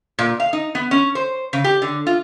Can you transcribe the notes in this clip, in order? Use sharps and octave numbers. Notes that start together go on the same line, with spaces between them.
A#2
F5
D#4
B3
C#4
C5
C#3
G4
D3
F4